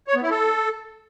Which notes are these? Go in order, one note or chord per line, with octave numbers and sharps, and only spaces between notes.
C#5
B3
E4
A4